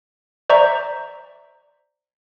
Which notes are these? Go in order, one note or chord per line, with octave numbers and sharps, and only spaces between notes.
C5 D5 E5 A#5 C#6